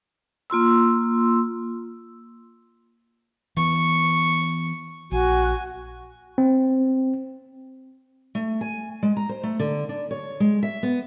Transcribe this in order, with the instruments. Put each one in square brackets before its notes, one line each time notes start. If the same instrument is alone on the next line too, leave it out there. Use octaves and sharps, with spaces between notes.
[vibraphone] A#3 F4 C6 E6
[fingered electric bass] E3 B3 [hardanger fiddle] C#6
[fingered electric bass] A#1 [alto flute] F#4 [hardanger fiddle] G#5
[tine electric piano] C4
[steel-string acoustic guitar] A3
G#5
G#3
A#5
C5
A3
D3
D4
C#5
G#3
E5
B3